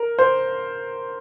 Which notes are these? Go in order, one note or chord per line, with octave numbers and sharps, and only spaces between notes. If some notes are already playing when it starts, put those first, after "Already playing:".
Already playing: A#4
C5